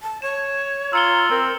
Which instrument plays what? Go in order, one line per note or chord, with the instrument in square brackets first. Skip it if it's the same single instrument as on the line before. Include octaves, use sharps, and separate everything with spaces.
[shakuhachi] A5
[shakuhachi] C#5 [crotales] E7
[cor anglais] F4 [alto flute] A#5 [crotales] E6 C#7 G7
[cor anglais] C4 [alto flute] A#4